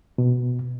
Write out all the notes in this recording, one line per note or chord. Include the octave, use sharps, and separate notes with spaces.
B2